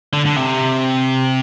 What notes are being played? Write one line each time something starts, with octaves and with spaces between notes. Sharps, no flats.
D3
D3
C3